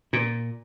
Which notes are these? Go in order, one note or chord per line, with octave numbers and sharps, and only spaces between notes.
A#2